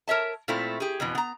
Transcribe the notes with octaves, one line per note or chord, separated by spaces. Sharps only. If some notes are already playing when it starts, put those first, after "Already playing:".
A#4 C#5 E5 A5
A#2 A3 C4 E4 F4
G4 G#4
F2 B2 E3
B3 A#5